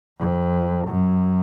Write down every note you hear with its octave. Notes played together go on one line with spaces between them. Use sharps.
F2
F#2